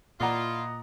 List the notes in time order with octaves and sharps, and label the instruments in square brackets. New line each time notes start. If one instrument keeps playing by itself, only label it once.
[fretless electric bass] A#2 [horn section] E4 F4 [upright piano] D5 F#5 A#5 [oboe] D#5